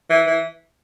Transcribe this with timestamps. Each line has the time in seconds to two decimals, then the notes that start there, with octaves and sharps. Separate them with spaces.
0.10 E3
0.27 E3